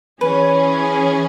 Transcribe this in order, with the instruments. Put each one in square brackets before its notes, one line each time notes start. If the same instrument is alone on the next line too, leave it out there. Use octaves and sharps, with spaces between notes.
[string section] E3 C#4 G#4 [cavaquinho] B4